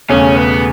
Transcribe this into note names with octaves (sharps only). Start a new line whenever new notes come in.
E1 E2 C#3 A3 C#4
B3